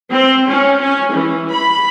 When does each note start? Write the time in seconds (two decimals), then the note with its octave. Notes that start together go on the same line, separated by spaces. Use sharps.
0.12 C4
0.49 C#4
0.81 C#4
1.14 E3
1.51 B5